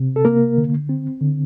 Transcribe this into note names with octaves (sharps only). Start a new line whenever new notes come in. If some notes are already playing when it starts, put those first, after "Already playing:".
Already playing: C3 C4
A4
A#3 A#4
D3
C4
D3